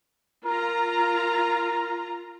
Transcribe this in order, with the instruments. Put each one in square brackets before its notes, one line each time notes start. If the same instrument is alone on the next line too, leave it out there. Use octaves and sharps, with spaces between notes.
[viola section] F4 A#5 [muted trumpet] A#4